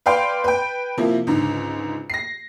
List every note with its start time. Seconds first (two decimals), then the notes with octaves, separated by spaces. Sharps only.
0.06 B4 D5 F5 G5 C6
0.44 B4 G5
0.97 C3 F3 A#3 E4
1.27 C#2 G#2 D3
2.10 A#6 C7